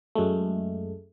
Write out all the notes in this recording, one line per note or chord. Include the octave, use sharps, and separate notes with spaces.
F#2 G#3 A3